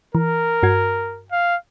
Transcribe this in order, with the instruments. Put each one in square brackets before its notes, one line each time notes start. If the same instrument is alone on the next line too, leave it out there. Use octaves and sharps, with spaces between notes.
[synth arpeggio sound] E3 [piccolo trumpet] A#4
[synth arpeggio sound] G2 F#4 G#6
[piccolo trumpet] F5